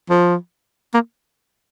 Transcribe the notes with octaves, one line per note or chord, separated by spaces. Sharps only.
F3
A#3